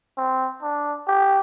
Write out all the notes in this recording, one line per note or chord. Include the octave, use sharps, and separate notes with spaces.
C4
D4
G4